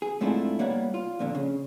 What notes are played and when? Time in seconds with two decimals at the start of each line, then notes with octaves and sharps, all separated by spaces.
0.02 G#4
0.21 G#2 A3 C4 D4 E4 F4
0.59 G3 A#3 B3 C#5 F#5
0.94 F4
1.19 F2 A#2 D3
1.35 C#3